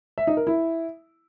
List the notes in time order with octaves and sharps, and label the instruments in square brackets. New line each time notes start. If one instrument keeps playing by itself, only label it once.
[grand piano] E5
D#4
A#4
E4